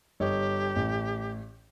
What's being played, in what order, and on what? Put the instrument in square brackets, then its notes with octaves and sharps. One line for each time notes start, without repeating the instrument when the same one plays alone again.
[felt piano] G1 C#5 D#5 [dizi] G4
[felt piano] A1